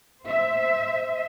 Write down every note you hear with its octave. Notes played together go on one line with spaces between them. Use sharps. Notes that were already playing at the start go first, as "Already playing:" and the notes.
C5 E5